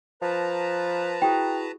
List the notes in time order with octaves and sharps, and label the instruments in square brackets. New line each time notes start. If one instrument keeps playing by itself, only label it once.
[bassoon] F3 [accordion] B4 A5 A#5
[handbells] E4 F#4 G#4 [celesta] G5